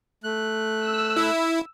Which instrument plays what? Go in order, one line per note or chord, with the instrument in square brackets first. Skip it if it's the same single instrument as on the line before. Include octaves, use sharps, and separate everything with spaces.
[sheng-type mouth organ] A3 F#6
[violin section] E6
[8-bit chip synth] E4